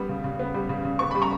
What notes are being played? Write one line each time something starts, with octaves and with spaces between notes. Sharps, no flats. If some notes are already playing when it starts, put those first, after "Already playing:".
Already playing: G3 B3
C#3
C#3
B3
G3
C#3
C#3
B3 C#6
G3 B5
A#5 C#6